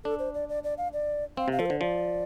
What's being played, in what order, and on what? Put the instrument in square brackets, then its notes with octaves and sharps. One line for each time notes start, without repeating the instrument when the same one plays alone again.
[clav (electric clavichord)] D4 [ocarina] A4
[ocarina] C5
D5
D5
D5
F5
D5
[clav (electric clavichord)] C4 [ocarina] F5
[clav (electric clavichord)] C3 [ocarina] F5
[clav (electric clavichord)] F3 [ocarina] A4
[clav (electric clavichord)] D3 [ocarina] C5
[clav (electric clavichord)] F3 [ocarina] D5